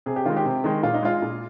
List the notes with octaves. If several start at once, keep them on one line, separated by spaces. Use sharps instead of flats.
C3 G#4
G4
D#3 G#3 F4
G4
C3
D#3 G#3
A#2 F4
D#4
G#3 F4
A#2